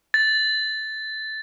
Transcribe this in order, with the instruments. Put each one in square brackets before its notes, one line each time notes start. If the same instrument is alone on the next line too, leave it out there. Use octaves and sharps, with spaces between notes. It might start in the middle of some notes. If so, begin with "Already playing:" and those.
[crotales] A6